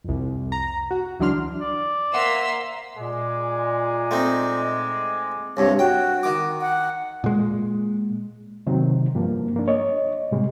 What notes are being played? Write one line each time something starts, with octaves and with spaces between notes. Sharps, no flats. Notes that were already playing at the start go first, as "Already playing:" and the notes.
C2 F2
A#5
F#4
C#2 E3 F#3 D4 C6 F6
D5
A#3 C5 E5 F#5 C6 E6
A#2 G#3 G#5 D6
A3 C4 D#4
C2 G2 C#5
F#4 G5
D#3 D6
F#5
A#2 G#3
C3 D#3 F#3 C4
G2 F3 A#3
A#3 D4
C#5 D#5
A2 C3 G3 G#3